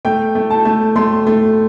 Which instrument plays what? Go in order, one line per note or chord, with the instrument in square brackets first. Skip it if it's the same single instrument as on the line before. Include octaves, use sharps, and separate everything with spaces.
[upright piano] A3 G5
A3
A5
A3
A3 C6
A3